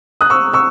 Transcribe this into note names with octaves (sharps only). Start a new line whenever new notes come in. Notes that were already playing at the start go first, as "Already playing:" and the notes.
D#6 F#6
C#6 E6
C#6 E6